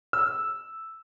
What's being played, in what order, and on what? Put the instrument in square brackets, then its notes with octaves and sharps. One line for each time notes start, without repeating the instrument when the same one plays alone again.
[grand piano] E6